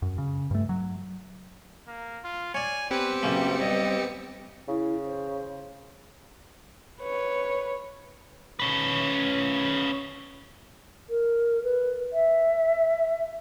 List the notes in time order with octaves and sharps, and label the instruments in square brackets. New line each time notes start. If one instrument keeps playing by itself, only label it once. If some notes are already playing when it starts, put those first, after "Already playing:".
[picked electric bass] F#2
C#3
G2 A3
F#3
[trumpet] A#3
F4
[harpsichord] C#5 D5 [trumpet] G#5
[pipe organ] B3 C5 [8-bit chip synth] C4 G4 C#7 [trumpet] B4
[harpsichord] F#2 C#3 A#3 [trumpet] G3
[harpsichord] G2 [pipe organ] B3 [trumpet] D#5
[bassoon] C#3 [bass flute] E4
[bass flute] C5
[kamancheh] B4 C#5
[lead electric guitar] C#4 B4
[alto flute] A#4
B4
E5